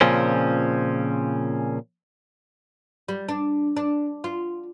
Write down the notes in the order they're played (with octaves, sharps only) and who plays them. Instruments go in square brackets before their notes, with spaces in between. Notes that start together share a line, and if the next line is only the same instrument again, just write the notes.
[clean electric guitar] A#2 C#3 F3 C4 C#4
[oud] G3
D4
D4
F4